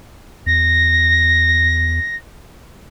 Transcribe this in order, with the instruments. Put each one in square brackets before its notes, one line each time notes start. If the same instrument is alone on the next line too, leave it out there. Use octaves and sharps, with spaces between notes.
[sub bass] E2 [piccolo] A#6